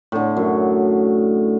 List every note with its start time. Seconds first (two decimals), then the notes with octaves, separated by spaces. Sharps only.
0.12 A2 D3
0.37 F#2